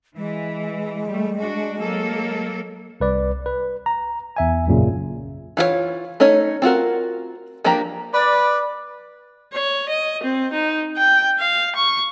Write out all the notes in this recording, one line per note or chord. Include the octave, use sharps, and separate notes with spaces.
E3 G#3
G3 A3
D4 F#4
F#3 A#3 A4
C2 B4 D5
B4
A#5
E2 E5 G#5
B1 F#2 A#2 C#3
E3 F4 F#4 C#5
A3 C#4 D#4 C#5
C4 F4 F#4 A#4
F3 A#3 D4 G4 A#5
B4 D5
C#5
D#5
C4
D#4
G5
F5
C#6